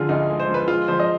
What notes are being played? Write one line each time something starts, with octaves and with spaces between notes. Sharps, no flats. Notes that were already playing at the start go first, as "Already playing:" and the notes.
Already playing: D3 F3 G#3 F4 G#4
D2 D#4
G#3
C5
F3
B4
G#3 F4
F3 C5
D#5